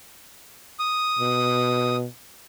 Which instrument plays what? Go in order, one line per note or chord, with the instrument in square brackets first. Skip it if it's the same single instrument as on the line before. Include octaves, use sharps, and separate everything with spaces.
[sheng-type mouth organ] D#6
[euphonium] B2